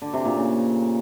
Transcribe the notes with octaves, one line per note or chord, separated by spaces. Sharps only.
D3
C3
A#2
C#3